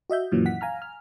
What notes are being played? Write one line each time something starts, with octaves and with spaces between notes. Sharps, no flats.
F#4 D#5 E5 G6
F#2 A#2 D#3 E3 F#3
F#5 B6
F5 G#5 A#5 F6
F6